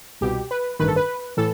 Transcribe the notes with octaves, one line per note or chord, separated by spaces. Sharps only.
C2 B2 G4
B4
A1 G2 D#3 B4
A4
B4
A2 E3 A4